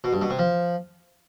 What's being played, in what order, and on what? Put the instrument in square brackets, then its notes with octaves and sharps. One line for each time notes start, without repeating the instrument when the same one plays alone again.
[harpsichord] B2
G2
B2
C3
F3